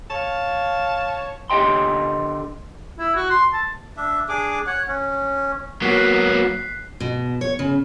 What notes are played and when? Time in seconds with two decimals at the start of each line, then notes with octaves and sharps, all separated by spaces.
0.11 C#5 F5 A5
1.50 D3 G4 D#5 G5 C6
2.99 E4
3.16 F#4
3.30 C6
3.53 A5
3.97 D4 E5
4.29 D4 G#4 D6
4.67 C#5 F#5
4.87 C#4
5.82 F#3 A#3 B3 F#4 F#6 B6 C7
7.00 B2
7.41 C#5
7.59 C#3